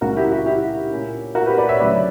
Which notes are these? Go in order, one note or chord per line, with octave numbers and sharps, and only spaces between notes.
C#2 C#3 G3 F#4 A#4
E4 G4
F#4
E4 G4
A#2 A#3 C#4
F#4 A#4
G4 B4
B4 D5
C#5 E5
D2 C#3 F#3 B4 D5